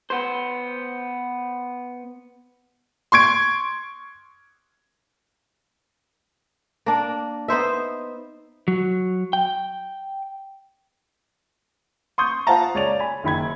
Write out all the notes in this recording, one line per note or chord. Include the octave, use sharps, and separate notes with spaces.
B3 C5
C6 C#6 G#6 D7
A#3 D4
B3 D#4 C5 E5
F#3
G5
C6 C#6 D#6 G6
F4 C5 F5 F#5 A5 A#5
C#2 C#5 D5 F7
G#5 B5
F#1 D#3 B5 G#6